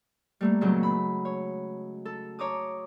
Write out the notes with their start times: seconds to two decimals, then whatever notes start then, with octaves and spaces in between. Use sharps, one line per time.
0.41 G3 A3 A#3
0.61 A#2 C#3 F#3 G#3 A3 C4
0.83 B5
1.25 C#5
2.05 A4
2.39 C#5 A#5 D6 D#6